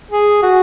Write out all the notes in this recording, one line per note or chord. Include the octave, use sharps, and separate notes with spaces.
G#4
F#4